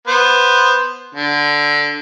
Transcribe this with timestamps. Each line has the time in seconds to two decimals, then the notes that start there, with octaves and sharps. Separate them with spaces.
0.08 B3 C5
1.15 D3